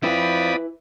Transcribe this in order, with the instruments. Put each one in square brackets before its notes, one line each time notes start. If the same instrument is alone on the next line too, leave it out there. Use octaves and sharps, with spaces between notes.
[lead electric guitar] C4 F4 [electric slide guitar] E4 B4 [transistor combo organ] D5 B5 D#6